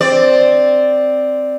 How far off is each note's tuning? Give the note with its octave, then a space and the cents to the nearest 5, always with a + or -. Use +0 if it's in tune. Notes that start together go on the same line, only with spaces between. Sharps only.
C4 +0 D5 +0